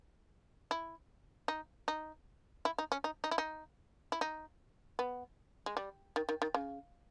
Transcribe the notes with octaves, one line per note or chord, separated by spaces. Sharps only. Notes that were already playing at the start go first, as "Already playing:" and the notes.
E4
D#4
D#4
E4
D#4
C#4
D#4
D#4
E4
D#4
E4
D#4
B3
G#3
G3
D#3
D#3
D#3
C#3